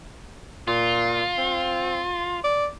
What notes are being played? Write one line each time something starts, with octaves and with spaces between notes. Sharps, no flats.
A#2 F4
C4
D5